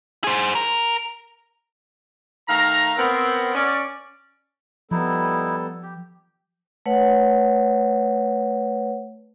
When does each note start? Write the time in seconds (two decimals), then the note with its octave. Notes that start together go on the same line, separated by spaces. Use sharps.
0.24 G#4 C5
0.55 A#4
2.49 D#3 A3 F5 A#5
2.97 B3 C4 A#4
3.54 C#4 D5
4.91 F3 G3 B3 D#4 E4 A4
5.83 G4
6.86 A3 B4 C#5 F#5